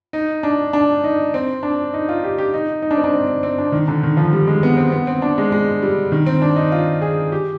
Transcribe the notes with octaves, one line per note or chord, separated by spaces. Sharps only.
D#4
D4
D4
D#4
C4
D4
D#4
F4
G4
G4
D#4
D#4
D4
C4
D4
C4
C4
C4
D4
D#3
D3
D#3
F3
G3
G#3
B3
C4
B3
C4
D4
G#3
G#3
G3
D#3
C4
D4
D#4
F4
G#4
G4